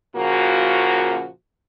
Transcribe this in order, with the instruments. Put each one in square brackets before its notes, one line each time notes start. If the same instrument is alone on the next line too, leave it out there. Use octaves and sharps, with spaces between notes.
[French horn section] A#2 C#3 F3 A#3 F#4